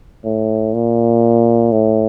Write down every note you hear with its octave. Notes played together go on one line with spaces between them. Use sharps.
A2
A#2
A2